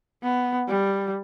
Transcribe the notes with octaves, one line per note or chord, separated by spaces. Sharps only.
B3
G3